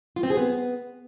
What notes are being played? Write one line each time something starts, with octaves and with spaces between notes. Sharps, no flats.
F4
C4
G#4
B3